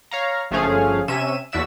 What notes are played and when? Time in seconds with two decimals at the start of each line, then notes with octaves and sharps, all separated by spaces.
0.11 C#5 F5 A#5
0.51 G1 F3 A3 C#4 G#4 F5
1.08 C3 C#4 E5 D#7 E7
1.52 E2 F#4 D5 E5 E6 E7